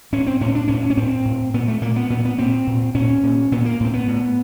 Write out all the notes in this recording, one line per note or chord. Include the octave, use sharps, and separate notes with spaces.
A2 C#4
C4
A2 C#4
D4
A2 C#4
C#4
A2 C4
A2
A#2 B3
A3
A#2 A#3
B3
A#2 B3
B3
A#2 C4
A#2
A#2 C#4
A#2
A#2 B3
A#3
A2 C4
B3
A2